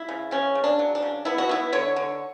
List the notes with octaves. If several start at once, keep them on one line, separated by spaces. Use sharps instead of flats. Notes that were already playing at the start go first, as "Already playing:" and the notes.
Already playing: E4
C#3
C#3 C#4
C#3
D4
F#3
D4
C#3
B3 E4
F#4
B3 E4
D3 C#5
D3